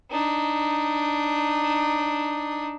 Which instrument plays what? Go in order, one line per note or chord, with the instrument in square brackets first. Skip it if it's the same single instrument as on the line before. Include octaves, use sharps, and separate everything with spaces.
[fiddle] D4 D#4